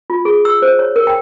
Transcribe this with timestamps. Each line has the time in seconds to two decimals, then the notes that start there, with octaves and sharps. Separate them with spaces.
0.10 F4
0.25 G#4
0.45 E6
0.62 C5
0.79 C#5
0.96 A#4
1.07 G5